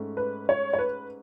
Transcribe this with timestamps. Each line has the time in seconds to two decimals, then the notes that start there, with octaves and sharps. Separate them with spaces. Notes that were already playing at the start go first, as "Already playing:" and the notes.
Already playing: G#2 A3 C#4
0.17 B4
0.49 C#5
0.73 C#5
0.79 B4